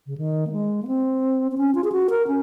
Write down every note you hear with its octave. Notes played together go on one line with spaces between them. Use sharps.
C#3
D#3
A#3
G#3
A#3
C4
C4
C#4
F4
G#4
F#4
A#4
C#4